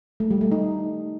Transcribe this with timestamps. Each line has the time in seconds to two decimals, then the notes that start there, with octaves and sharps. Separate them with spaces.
0.20 A3
0.31 G3
0.41 A3
0.52 D#4